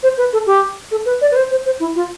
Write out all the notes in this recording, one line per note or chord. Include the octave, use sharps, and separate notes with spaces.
C5
B4
A4
G4
A4
B4
D5
B4
C5
C5
C5
E4
F4